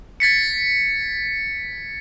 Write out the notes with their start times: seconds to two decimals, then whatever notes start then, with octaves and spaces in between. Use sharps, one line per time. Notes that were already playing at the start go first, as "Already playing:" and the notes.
0.20 G#6 A6 B6 C#7